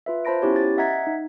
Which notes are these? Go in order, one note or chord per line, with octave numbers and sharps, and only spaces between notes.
F4 B4 E5
F4 C5 A5 B5 A#6 D7
B3 C#4 E4 G4 C#5
A6
D#5 E5 F#5 A#5 G#6 B6
D#4